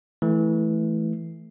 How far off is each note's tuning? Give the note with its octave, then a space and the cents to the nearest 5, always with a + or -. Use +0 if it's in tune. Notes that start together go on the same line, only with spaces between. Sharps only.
E3 +0 A3 -10